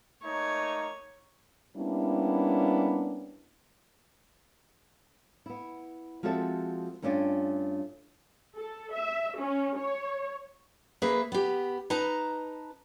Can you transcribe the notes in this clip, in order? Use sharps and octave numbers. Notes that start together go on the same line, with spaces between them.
A3 A#3 D#4 C#5
G3 A#3 B3 C#4 D4 E4
B3 E4
F3 G#3 C4 F#4 A4 E5
G2 A3 C#4 D4 F4 G#5
A4
E5
C#4
C#5
A#3 G#4 B4 E5
B3 G4
D#4 B4 A5 A#5